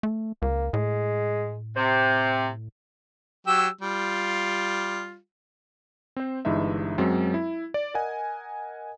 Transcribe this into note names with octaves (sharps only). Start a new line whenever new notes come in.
A3
C#2 A#3
A2 G#3
C3 C5
F#3 G4 E6
G3 F4
C4 C5
G1 G2 E3 G#3 D#4 E5
F#2 F#3 G#3 C4
E4
D5
A#4 D#5 F#5 G#5